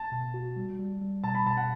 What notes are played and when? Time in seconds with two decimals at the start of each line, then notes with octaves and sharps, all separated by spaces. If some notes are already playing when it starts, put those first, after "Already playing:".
Already playing: A5
0.12 B2
0.34 F#4
0.56 G3
0.79 G3
1.01 G3
1.24 B2 A5
1.35 B5
1.46 B2 A5
1.57 F#5